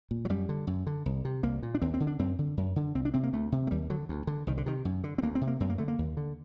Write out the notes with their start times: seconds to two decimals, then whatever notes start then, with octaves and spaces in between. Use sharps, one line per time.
0.11 A#2
0.25 F#3
0.30 F#2 G3
0.49 D3
0.67 F#2
0.87 D3
1.06 C2
1.25 C3
1.43 C2 A#3
1.63 A#2
1.75 D4
1.82 D#2 C4
1.94 C4
2.00 D3
2.07 D4
2.19 F#2 C4
2.39 D3
2.57 F#2
2.76 D3
2.95 C2 C4
3.05 D4
3.14 C3 C4
3.23 A#3
3.33 D2 A3
3.52 C3
3.67 A3
3.71 D#2 G3
3.90 D3 F#3
4.09 D2
4.27 D3
4.47 C2 D#3
4.57 D3
4.66 C3 D#3
4.85 F#2
5.04 D3
5.18 C4
5.22 D2 A#3
5.35 C4
5.41 C3
5.47 A#3
5.60 F#2 C4
5.70 A#3
5.78 D3 A3
5.88 A#3
5.99 D#2
6.17 D3